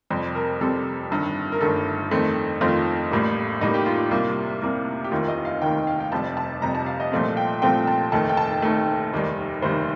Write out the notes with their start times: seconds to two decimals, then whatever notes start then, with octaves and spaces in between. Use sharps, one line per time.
0.10 F2 C3 G3 C4
0.35 A#4
0.61 F2 C3 G3 C4 A4
1.11 G1 G2 D#3
1.52 A#4
1.61 G1 G2 D#3 A4
2.11 F2 D#3 A3 C4
2.61 F2 D#3 A3 C4 F4
3.11 A1 A2 G3 A#3
3.61 A1 A2 G3 A#3 D#4
3.74 G4
3.86 F4
4.11 C2 C3 G3 A#3
4.62 C2 C3 G3 A#3
5.04 G4
5.11 F1 D#2 D#3 F4
5.28 D#5
5.45 F5
5.62 F1 D#2 D#3 G5
5.87 F5
6.00 G5
6.12 F1 F2 C3 G3 A5
6.37 A5
6.62 F1 F2 C3 G3 A#5
6.75 A5
6.86 F5
7.00 D#5
7.12 C2 A#2 F3 A3 C4 F5
7.37 G5
7.62 C2 A#2 F3 A3 C4 G5
7.87 A5
8.12 F1 D#2 D#3 A3 A5
8.29 G5
8.37 A5
8.62 F1 D#2 D#3 A3
9.12 F1 D#2 D#3 G3
9.62 F1 D#2 D#3 G3 C5